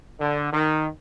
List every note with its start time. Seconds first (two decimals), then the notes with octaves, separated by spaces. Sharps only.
0.20 D3
0.52 D#3